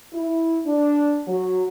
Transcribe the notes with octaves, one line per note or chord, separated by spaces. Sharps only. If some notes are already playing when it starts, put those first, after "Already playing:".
E4
D4
F#3